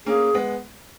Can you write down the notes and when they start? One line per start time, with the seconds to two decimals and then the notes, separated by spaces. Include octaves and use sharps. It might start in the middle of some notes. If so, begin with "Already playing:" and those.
0.06 A#3 C#4 G#4
0.35 G#3 B3